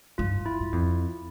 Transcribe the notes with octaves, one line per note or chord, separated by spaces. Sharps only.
G2 F4
E4
G2
F2